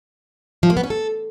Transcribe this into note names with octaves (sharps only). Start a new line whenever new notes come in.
F3
A#3
B3
C#4
A4